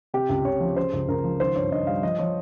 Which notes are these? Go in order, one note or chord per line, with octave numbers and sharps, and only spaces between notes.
C3 G4
C#2
C#2 C#5
F3
C#3 C5
C#2
C#2 A#4
F3
D#3 C5
G2 C#5
G2 D#5
G3 F5
F3 D#5
F3 C#5